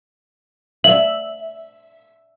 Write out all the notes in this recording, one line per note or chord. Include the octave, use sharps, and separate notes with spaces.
E5 F#7